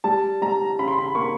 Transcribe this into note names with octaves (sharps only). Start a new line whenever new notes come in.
G3 A5
G3 A#5
C#3 B5
C6
B5
A#3 C#6